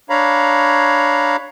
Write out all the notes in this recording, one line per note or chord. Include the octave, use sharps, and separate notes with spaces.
D4 C#5 F5 A#5 B5